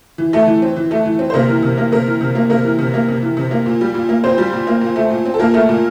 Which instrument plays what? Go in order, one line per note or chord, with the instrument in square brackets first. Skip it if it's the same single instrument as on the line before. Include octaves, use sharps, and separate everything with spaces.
[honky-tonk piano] E3
A3
E3
C4
E3
A3
E3
C4
C5
C3 A#3 A#4
E3
C3
A#3
C3 A#3 A#4
E3
C3
A#3
C3 A#3 A#4
E3
C3
A#3
C3
E3
C3
A#3
A#2
G3
A#2
A#3
A#2 C4 C5
G3
A#2
A#3
A#2
A3
A#2
C4
A4
A#2 A#3 A#4
A3
A#2